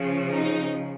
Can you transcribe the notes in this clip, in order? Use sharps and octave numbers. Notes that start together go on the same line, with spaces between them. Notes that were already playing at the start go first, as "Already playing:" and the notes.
Already playing: C#3 F3
D#4